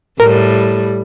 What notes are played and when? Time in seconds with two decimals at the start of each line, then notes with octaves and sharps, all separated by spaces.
0.20 A2 G3 A#4